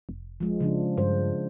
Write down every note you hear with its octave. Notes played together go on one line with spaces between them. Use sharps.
F1
F3 G#3
C#3 F3 D4
G2 C5